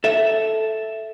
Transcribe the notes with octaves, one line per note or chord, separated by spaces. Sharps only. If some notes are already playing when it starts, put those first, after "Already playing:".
A4 E5